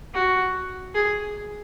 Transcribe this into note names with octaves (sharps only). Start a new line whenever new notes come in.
F#4
G#4